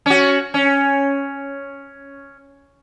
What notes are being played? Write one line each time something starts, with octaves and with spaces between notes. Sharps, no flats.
C#4 F#4
C#4